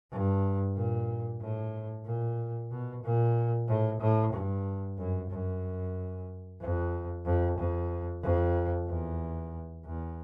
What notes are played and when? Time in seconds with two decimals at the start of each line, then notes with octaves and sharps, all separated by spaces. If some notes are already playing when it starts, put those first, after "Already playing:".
0.11 G2
0.76 A#2
1.41 A2
2.06 A#2
2.71 B2
3.03 A#2
3.68 A2
4.01 A2
4.33 G2
4.98 F#2
5.30 F#2
6.61 F2
7.26 F2
7.58 F2
8.23 F2
8.88 E2
9.85 E2